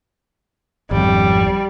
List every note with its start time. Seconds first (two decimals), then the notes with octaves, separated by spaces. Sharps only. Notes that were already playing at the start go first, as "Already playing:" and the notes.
0.91 G#1 F2 G3